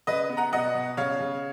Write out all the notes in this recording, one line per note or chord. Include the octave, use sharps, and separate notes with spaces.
C#3 B4 D#5
B3
F#5 A#5
B2 D#5 F#5
B2
C#3 C#5 F5
C#3